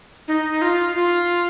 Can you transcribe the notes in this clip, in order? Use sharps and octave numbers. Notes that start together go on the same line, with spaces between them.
D#4
F4
F4